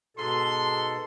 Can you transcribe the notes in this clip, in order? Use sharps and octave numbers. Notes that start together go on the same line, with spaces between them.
G#2 B2 A4 C6